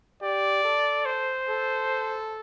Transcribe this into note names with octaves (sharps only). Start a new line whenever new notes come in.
G4 D5
A4
C5
A4